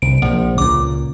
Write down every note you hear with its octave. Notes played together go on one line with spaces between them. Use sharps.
C2 D7
A#1 F3 A#3
C#2 A#2 D6